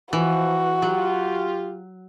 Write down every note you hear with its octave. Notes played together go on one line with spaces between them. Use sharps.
E3 F3 F#4
F#3 F4 G4